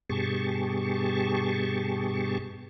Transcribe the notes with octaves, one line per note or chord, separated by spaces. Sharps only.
G2 B2 G4 G#4 A5 C#6